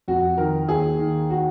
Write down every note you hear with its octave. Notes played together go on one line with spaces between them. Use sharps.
F2 F#4
D#3 A#4
D#2 G#4
D#3
F#4